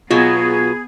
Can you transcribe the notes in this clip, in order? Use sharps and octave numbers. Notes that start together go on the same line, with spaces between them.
B2 F#3 B3 F4 G#4